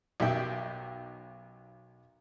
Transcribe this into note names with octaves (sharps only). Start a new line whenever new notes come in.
B1 F#2 D#3 G4 E5 G5